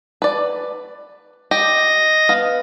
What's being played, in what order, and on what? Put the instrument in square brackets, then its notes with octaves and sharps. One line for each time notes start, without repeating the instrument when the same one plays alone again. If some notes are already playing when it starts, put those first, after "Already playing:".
[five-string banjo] B4 D5
[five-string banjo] G4 [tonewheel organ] D#5 A#6
[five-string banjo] B3 F5